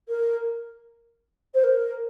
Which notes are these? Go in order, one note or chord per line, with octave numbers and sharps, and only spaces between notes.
A#4
C5
A#4